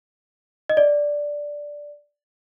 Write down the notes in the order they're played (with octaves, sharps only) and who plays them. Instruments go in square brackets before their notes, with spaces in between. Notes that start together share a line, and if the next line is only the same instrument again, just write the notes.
[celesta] D#5
D5